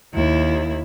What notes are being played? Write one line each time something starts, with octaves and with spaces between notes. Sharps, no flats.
D#2 E4